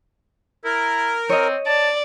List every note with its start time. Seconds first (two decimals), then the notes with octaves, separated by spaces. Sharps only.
0.65 E4 A#4
1.29 C4 C#5 D#5
1.66 D5 A5